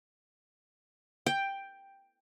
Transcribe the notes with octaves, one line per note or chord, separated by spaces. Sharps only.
G5